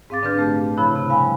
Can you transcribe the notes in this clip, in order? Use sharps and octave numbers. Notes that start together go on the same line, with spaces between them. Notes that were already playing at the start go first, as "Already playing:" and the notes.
G#2 C4 F5 D6 A6
D3 C4 D4 B4 F6 G6
A#2 A3 G4
C#3 F3 E4 B5 F#6
C3
G3 F5 G#5 B5